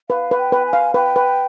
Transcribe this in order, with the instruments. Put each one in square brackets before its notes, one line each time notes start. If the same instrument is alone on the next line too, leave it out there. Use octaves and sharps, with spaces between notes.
[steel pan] B4 [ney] F5
[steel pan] B4
[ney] G5
[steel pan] B4
[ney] G#5
[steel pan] F5
[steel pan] B4 [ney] G5
[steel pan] B4